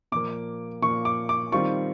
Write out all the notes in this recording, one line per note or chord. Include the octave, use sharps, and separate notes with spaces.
A#2 F3 A#3 D6
A#2 F3 A#3 C#6
D6
D6
D#3 G3 C4 F4 C#6